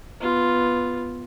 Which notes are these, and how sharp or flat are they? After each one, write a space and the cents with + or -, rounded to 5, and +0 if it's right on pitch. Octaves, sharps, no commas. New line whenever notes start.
B3 +0 F4 +0